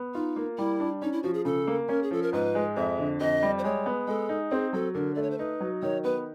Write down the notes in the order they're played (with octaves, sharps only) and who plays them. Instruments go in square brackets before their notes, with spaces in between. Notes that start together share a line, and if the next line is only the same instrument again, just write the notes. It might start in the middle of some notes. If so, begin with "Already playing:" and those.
Already playing: [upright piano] B3
[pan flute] D#4 [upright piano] F4
[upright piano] A#3
[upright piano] G3 [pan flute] E4
[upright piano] D4
[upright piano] C#4 [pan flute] D#4
[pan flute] E4
[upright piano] F3 [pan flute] F#4
[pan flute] G#4
[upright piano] C#3 [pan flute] A4
[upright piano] A#3
[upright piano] C#4 [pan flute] A#4
[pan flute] G#4
[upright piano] F3 [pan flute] A4
[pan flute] A#4
[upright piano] G#2 [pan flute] B4
[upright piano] G#3
[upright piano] F2 [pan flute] E5
[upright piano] D3
[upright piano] F2 [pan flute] D#5
[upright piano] G3
[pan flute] C5
[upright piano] G#3 [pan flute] C#5
[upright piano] B3
[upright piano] G#3 [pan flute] A4
[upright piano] D#4
[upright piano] C4 [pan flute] G#4
[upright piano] F#3 [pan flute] A4
[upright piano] D3 [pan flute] A#4
[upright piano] A3 [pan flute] D5
[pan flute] C#5
C5
[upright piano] D#4 [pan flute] B4
[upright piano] F#3
[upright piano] D#3 [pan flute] C#5
[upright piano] B3 [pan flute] B4